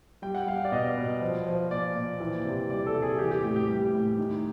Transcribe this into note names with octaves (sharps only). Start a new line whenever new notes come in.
G3 G5
F#5
G3 F5
D5
B2 D#5
B2
F3
F3
A#2 D5
A#2
E3
C3
G3 D5
A4
C3
G#4
E3 G4
G4
A2 G4
G4
G3 G4
A2
D#3